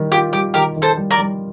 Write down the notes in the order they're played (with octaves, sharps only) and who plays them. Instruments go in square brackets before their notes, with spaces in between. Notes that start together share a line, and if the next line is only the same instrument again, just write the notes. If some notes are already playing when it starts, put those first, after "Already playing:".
Already playing: [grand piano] D#3 G3
[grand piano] F4 [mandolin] G4
[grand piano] G3 [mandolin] G4
[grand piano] D#3 [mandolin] G4 A#4
[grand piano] D#3
[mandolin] A4 C5
[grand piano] G3
[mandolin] A#4 D5
[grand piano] G3